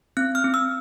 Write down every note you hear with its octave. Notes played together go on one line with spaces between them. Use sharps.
C4 F#6
F6
C4
E6